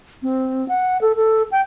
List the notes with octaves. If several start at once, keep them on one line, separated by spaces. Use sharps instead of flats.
C4
F#5
A4
A4
G5